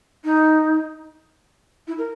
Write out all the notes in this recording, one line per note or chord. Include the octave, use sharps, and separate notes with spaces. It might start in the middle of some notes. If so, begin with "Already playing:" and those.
D#4
E4
A#4